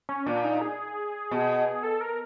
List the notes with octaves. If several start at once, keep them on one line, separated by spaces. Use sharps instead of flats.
C#4
A#2 D4
D#4
G#4
B2
A4
A#4